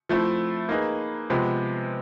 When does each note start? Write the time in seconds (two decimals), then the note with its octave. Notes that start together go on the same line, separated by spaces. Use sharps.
0.09 F3 A3 C4 E4
0.69 A#3 D#4 G#4 B4
1.30 C3 F3 G#3 B3